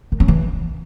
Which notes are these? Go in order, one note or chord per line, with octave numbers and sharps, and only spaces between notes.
D#3
C#4
E3